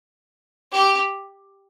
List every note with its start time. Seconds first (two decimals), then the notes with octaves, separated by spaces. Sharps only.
0.72 G4